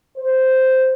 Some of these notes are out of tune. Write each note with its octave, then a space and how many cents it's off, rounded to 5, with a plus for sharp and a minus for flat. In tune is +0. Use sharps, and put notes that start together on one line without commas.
C5 -5